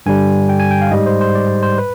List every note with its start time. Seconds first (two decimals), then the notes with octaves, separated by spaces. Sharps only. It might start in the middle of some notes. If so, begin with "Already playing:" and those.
0.06 G2 D3 G3 G#5
0.49 G5
0.60 G#5
0.71 G5
0.82 F5
0.91 G#2 G3 D#5
1.06 C5
1.21 C5
1.35 D5
1.63 C5
1.78 B4